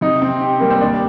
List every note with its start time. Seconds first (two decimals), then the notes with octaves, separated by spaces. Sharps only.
0.01 C3 D#4
0.22 C4
0.41 G4
0.60 G3 A#3
0.70 C4
0.81 D#2 D4